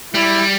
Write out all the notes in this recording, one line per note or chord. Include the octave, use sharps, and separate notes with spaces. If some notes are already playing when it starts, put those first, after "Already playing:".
G3 E4